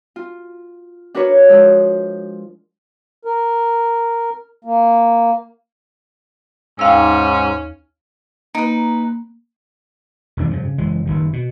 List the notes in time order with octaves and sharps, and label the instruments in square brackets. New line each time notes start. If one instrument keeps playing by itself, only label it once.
[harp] F4
D4 F#4 A#4 B4 C#5
F3 G#3
[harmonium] A#4
A#3
[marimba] D#2 F5 E6 [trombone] G#2 [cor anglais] C#4
[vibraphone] A#3 [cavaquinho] D#4 B4
[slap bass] E1 D#2 D4
G2 C#3 F3
C#3
F#1 E3 G#3
F#1 G2 D#3
B2